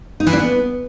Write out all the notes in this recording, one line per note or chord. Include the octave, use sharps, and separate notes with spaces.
D#4
E3
D4
B3